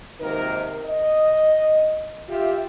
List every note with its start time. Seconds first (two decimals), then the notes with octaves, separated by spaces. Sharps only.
0.19 G#1 C3 A#3 D#4 A#4
0.85 D#5
2.29 F4 G4 E5